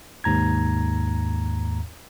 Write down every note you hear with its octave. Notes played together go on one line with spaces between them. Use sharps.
D#2 G#2 A#5 G#6